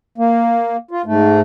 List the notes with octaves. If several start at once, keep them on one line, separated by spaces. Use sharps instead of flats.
A#3
F4
G#2 A3